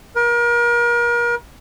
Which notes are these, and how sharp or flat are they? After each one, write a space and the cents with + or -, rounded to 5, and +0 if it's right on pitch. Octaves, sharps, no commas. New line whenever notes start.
A#4 +35